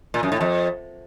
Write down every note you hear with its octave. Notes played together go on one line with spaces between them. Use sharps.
A#2
F#2
A2
F2